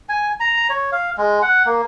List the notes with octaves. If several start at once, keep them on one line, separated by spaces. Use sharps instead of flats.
G#5
A#5
C#5
F5
G#3
F#5
A#3